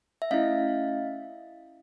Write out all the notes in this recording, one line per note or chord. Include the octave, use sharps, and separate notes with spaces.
E5
A3 C#4 E4 D#5 F5